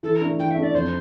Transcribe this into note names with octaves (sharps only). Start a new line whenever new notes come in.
E3 A4
A#4
A3 D4
E3 G5
E5
A3 D4
D5
F2 C5